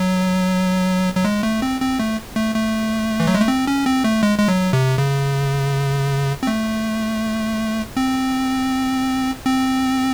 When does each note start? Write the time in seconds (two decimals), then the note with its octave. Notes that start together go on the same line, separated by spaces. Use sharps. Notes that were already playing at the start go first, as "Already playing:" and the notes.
Already playing: F#3
1.16 F#3
1.25 G#3
1.43 A3
1.62 C4
1.81 C4
1.99 A3
2.36 A3
2.55 A3
3.20 E3
3.27 F#3
3.35 G#3
3.41 A3
3.48 C4
3.67 C#4
3.86 C4
4.04 A3
4.23 G#3
4.38 G#3
4.48 F#3
4.73 C3
4.98 C#3
6.43 C4
6.47 A3
7.97 C4
9.46 C4